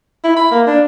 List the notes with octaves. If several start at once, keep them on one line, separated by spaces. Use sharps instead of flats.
E4
B5
A#3
D4